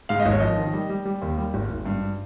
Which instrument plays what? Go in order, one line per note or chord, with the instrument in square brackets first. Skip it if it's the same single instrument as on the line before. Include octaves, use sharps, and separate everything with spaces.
[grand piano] G#2 F5
D#5
G#1 C#5
F3 D#5
D#3
G3
G3
G3
D#2
G3
G#1
G#1
G2